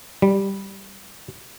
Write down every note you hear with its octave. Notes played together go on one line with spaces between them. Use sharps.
G3